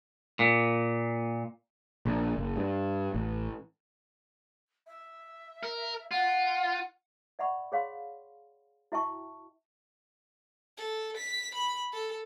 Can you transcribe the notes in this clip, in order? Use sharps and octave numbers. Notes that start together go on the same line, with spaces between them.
A#2
A#1
F#1
G2
A1
E5
A#4
F4 F#5
D5 E5 F#5 B5 C#6
G#4 C#5 F5 B5 C6
E4 F#4 E5 G5 A5 C#6
A4
B6
B5
A4